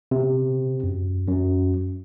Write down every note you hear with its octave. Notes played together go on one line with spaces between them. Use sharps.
C3
F#2
F#2